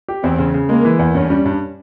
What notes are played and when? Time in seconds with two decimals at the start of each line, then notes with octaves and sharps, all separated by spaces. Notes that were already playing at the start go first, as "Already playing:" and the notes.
0.08 G4
0.23 E2 C4
0.39 C#3
0.54 C#3
0.69 G#3 A#3
0.85 E3
0.99 E2
1.15 G2 C#4
1.30 G3
1.46 G2